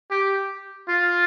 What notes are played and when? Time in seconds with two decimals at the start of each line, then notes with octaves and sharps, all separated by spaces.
0.11 G4
0.89 F4